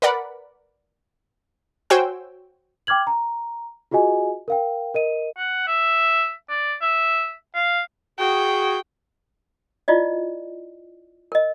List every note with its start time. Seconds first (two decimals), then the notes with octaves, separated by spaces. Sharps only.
0.02 A#4 B4 D5 F#5 B5
1.90 F#4 C5 C#5 G5 G#5 E6
2.87 G5 D6 F6 G#6 F#7
3.07 A#5
3.91 F4 F#4 G#4 D#5 G#5
4.48 A#4 F5 G5
4.94 A#4 D#5 D#7
5.37 F#5
5.67 E5
6.50 D5
6.82 E5
7.55 F5
8.20 F#4 G#4 G5
9.88 E4 F4 D5 D#5
11.32 A#4 D#5